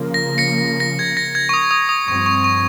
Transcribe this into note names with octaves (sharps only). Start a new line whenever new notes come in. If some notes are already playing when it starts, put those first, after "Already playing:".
Already playing: C#3 F3 A#3
A#6
A#6 C#7
A#6
G#6
A#6
G#6
C#6
D#6
D#6
D#6
G2 F3 C4 C#6
C#6
C#6